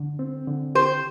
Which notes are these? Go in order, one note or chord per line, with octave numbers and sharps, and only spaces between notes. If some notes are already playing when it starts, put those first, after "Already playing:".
Already playing: D3
C4
D3
G4 C5